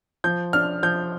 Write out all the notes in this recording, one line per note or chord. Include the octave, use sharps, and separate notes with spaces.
F3 G6
D4 F6
F3 G6